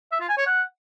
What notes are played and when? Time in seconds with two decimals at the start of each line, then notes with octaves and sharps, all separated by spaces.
0.12 E5
0.21 F4
0.29 G#5
0.38 C#5
0.46 F#5